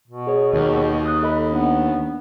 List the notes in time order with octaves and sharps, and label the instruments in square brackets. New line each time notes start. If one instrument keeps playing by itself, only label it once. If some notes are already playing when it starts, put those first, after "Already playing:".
[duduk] B2
[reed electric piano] G#4 C#5
[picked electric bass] D#2
[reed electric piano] D#6 F#6
A4 D#5 B5
[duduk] B3 [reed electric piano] D4